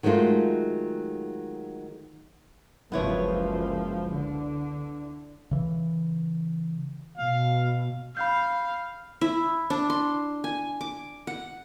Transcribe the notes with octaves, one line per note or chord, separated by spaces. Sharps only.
D#3 F#3 G#3 A3 F4
F#1 C#2 F3 B3 E4 C#5
D3
C#3 E3
B2 F5
F5 B5 G6
E4
D4
C6
G#5
D6
F#5